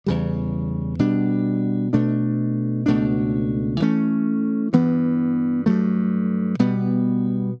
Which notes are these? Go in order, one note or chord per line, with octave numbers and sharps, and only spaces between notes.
E2 C#3 G3
B2 G3 D4
B2 A3 D4
C#2 B2 A3 D4
G2 E3 A3 C#4
G2 E3 B3
G2 F#3 A3
B2 G3 B3